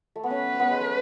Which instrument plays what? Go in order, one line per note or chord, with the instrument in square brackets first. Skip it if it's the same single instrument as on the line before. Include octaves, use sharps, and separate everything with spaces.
[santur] A3
B3
[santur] C#4 [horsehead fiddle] B4
[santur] B3
G#3
A3